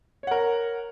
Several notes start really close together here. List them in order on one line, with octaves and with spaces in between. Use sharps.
C#5 F#5 A#4